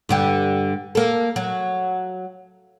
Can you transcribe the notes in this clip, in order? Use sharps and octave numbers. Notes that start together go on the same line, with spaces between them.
G2 D3 G4
A#3 A4
F#3